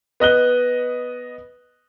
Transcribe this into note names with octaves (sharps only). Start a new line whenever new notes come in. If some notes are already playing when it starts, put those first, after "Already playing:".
B3 D#5 F#6 G7